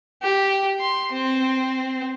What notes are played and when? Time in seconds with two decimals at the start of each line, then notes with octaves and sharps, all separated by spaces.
0.22 G4
0.80 C6
1.12 C4